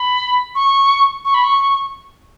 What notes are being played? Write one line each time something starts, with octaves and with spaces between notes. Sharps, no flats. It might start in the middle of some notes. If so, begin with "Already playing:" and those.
Already playing: B5
C#6
C#6
B5
C#6